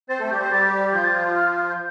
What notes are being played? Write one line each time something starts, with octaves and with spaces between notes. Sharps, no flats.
C4 C5 A6
A3 A4
G3 G4 G6
C4 C5
G3 G4 A6
F3 F4 G6
A6
G6
F6
G6